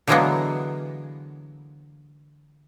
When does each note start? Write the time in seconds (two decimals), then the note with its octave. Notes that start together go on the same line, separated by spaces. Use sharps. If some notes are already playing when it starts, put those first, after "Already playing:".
0.07 D3 E3 F#3 G#3 A#3 B3